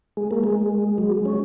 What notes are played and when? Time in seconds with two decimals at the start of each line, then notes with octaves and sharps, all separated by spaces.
0.17 G#3
0.31 A#3
0.44 G#3
0.98 F#3
1.12 G#3
1.25 C#4